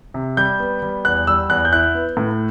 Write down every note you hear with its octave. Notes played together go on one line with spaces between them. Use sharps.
C3
G3 G6
B3
G3
E2 F#6
G3 E6
E2 F#6
G6
E4 F#6
B3
A2